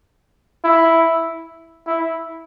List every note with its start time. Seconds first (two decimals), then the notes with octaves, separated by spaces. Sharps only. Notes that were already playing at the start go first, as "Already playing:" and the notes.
0.64 E4
1.87 E4